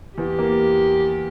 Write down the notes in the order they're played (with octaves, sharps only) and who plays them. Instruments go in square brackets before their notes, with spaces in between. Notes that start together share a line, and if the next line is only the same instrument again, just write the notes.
[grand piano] E2 [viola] G4
[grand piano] A#3